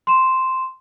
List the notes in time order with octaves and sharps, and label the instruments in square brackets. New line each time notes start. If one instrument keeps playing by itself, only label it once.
[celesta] C6 E7